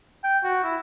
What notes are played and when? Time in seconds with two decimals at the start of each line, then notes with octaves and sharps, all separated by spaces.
0.24 G5
0.43 F#4
0.64 E4